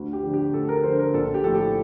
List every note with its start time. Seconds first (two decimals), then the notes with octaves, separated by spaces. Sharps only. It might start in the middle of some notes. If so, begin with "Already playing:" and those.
Already playing: D2
0.13 G4
0.23 D3 F3
0.34 G4
0.53 D2 A4
0.69 A#4
0.83 D3 F3 C5
0.99 A#4
1.14 A#1 A4
1.34 G4
1.44 A2 F3 A4
1.55 G4